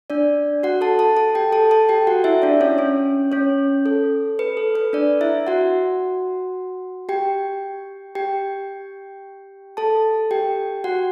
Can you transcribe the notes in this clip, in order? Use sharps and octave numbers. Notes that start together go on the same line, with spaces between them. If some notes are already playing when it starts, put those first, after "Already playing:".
D4 D5
F#4 F#5
A4 A5
A4 A5
A4 A5
G4 G5
A4 A5
A4 A5
G4 G5
F#4 F#5
E4 E5
D4 D5
C#4 C#5
C#4 C#5
C#4 C#5
A4
B4
A4
B4
D4 D5
E4 E5
F#4 F#5
G4 G5
G4 G5
A4 A5
G4 G5
F#4 F#5